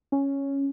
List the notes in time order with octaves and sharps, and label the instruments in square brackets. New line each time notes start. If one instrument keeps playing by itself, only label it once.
[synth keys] C#4